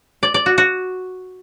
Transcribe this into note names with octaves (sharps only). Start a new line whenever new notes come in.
D5
D5
F#4
F#4